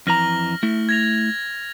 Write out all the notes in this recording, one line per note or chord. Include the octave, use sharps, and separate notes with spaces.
F2 E3 A#5 F6 A#6 F#7
A3 E4
G#6 A#6 F7